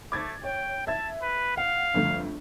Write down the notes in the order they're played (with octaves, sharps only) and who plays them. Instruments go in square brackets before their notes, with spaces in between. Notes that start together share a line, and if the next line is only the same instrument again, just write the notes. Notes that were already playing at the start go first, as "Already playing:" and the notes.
[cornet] A3 [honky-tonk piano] D6 G#6 A6
[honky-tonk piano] C#5 [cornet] G5
[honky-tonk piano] E5 G#6 [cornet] A5
[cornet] B4
[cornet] F5 [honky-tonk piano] F#5
[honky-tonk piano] G1 F2 A3